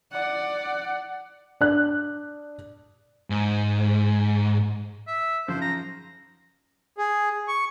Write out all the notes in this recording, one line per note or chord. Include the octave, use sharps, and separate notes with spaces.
D5 F#5
D4 F#6
G#2
E5
F#2 C#3 F3 C5
A#5
G#4
C#6